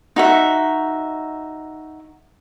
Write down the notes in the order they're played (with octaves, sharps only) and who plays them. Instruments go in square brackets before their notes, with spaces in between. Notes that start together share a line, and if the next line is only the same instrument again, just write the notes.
[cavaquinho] D#4 F#4 E5